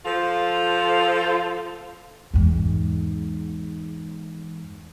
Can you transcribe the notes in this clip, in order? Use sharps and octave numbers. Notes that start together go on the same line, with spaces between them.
F3 F4 A4
E2 G#2